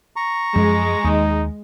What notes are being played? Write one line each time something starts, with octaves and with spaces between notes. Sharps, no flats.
A#5 C#6
F#2 F3 G#3
D#2 D#4